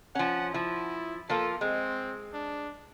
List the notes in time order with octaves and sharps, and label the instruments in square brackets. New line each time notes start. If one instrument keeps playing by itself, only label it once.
[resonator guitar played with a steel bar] F3 C#4 [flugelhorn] F#5
[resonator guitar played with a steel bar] F3 [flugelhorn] E4
[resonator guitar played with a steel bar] F3 A#3 F4 [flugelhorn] A4
[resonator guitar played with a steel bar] G#3 [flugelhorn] C4
[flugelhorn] D4